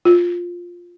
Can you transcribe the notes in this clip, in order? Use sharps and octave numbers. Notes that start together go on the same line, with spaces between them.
F4